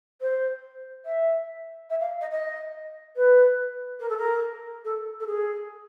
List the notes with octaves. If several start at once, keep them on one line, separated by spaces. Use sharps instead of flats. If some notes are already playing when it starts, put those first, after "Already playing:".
C5
E5
E5
F5
D#5
D#5
B4
A#4
A4
A#4
A4
A4
G#4